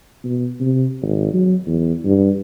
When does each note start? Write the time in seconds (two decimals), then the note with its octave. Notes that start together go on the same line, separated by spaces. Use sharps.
0.24 B2
0.60 C3
1.02 G#1
1.34 F#3
1.67 E2
2.04 G2